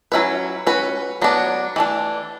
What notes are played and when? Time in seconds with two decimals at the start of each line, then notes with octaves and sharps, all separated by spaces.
0.12 F#3 C#4 E4 B4
0.67 C#4 F#4 B4
1.22 F#3 B3 D4
1.76 E3 A3 D4